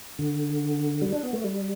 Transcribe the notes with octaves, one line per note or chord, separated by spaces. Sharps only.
D3
G3
D4
B3
A3
G3